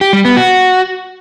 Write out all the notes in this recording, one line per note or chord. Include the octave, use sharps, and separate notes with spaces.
G4
G3
B3
F#4